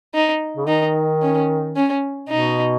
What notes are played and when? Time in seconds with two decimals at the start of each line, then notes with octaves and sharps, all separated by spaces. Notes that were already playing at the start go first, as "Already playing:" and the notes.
0.14 D#4
0.57 C#3
0.68 D#3 D#4
1.22 C#4
1.76 C#4
2.29 B2 D#4